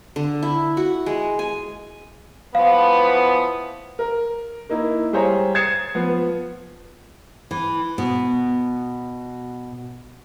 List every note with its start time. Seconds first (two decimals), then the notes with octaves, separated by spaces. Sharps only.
0.16 D3
0.43 E4
0.77 F#4
1.06 G#3
1.39 G#5
2.55 E3 F3 B3 F5
3.99 A#4
4.70 A#3 D#4 E4
5.13 G3 G#4 C5 C#5 A#5
5.55 D#6 G#6 A6 C7 C#7 E7
5.95 F3 B3 B4
7.51 E3
7.98 B2